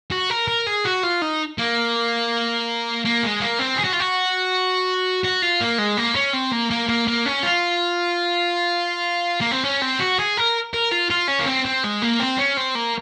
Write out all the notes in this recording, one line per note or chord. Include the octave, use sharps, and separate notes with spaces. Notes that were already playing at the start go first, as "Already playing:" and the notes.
F#4
A#4
A#4
G#4
F#4
F4
D#4
A#3
A#3
G#3
A#3
C4
G#4
F#4
F4
F#4
F#4
F4
A#3
G#3
A#3
C#4
C4
A#3
A#3
A#3
A#3
C#4
F4
A#3
C4
C#4
C4
F#4
G#4
A#4
A#4
F4
F4
C#4
A#3
C4
C4
G#3
A#3
C4
C#4
C4
A#3